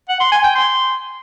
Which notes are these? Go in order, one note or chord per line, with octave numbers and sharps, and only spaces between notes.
F#5
C6
G#5
G5
C6